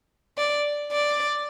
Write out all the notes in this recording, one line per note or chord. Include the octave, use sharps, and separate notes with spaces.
D5
D5